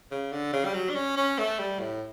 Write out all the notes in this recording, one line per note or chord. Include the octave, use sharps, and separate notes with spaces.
C#3
D3
C#3
G3
F#3
D4
C#4
C#4
A3
G3
A2